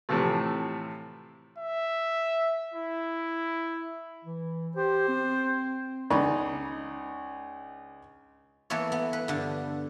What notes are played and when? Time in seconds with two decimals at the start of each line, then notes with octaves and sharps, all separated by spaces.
0.09 A2 C3 E3 F3 A3
1.58 E5
2.74 E4
4.25 E3
4.76 G4 C5
5.08 C4
6.10 C#2 D4 D#4 B5 C#6
8.70 E3 A#3 B3 A4 C#5
8.92 B3
9.13 B4
9.28 G2 D3